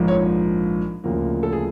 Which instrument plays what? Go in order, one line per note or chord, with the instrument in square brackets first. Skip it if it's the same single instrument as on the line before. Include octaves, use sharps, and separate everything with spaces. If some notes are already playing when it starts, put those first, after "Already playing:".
Already playing: [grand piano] A#1 G#2 F3
C#5
D2 C#3 F3 A#3
A4
G#4